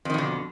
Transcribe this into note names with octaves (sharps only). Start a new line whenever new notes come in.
F2 B2 D3 D#3